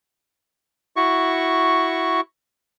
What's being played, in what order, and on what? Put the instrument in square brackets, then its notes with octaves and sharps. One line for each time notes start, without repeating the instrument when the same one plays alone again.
[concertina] E4 F#4 C#6